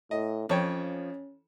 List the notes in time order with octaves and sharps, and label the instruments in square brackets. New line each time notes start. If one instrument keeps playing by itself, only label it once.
[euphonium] A2 [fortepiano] D#5
[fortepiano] F2 C#5 G5 [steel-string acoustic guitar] F3 [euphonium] C#4